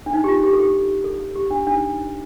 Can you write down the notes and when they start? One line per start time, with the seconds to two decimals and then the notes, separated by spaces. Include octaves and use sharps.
0.06 D4
0.13 D#4
0.24 G4
0.28 F4
0.43 G4
0.53 A4
0.59 G4
1.04 A4
1.35 G4
1.51 D4
1.67 D4
1.73 D#4